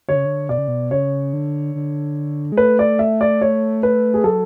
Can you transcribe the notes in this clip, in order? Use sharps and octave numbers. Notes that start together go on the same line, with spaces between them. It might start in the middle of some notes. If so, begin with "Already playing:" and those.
D3 C#5
C#3
D3
B2 D5
C#3
B2
C#3 C#5
D3
D3
G#3
A3 B4
D5
E5
D5
C#5
B4
G#4
F#3 A4